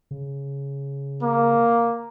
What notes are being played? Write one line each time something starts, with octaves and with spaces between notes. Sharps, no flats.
C#3
A#3